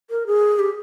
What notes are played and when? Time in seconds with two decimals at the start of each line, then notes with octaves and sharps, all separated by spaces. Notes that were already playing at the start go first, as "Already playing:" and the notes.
0.10 A#4
0.27 G#4
0.59 G4